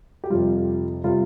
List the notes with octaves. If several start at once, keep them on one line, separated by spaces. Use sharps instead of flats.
G4
F2 C3 G3 F4
C3 G3 F4